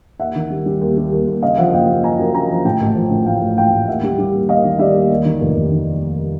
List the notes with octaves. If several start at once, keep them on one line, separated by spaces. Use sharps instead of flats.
D#2 E5 F#5
D#3
G3
G3
D#2
G3
D#2
D#2
C#3 D#5 F5
F3 E5 F#5
F#1 F5 G5
F#1
F#1 G#5 A#5
F#2
C#3 G#5 A#5
F3
A2 G5 A5
A1
F3
A2
A1 F5 G5
A1
A1 F5 G5
A1
D#2 E5 F#5
G3
G3
D#2
D#2 D#5 F5
D#3
G3 D5 E5
D#2
D#2
D#3
F1
F1
D#3